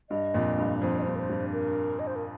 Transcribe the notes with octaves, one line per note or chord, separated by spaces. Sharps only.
G2 D#5
F2 A#2
G2
F2 C5
D#5
G2 C5
A#4
C5
G2
A#4
D#5
C5
A#4